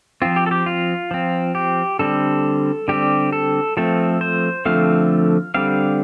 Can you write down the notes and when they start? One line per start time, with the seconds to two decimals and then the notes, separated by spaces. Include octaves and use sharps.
0.22 F3 C4 F4
0.36 G4
0.46 A4
0.51 G4
0.66 F4
1.11 F3 C4
1.55 G4
1.99 D3 G3 C4 A4
2.88 D3 G3 C4 G4
3.33 A4
3.77 F3 A3 C4 A4
4.21 C5
4.65 D3 F3 A3 C4 F5
5.54 D3 G3 C4 F5